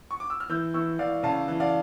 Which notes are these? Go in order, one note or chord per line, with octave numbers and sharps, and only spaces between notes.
C#6
D6
E6
F6
E3 E6 G6
E3 C#6 E6
E3 D5 F5
C#3 F5 A5
E3
D5 F5